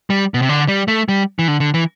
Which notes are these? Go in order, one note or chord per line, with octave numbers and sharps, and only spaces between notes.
G3
B2
C3
D3
G3
A3
G3
E3
D3
D3
E3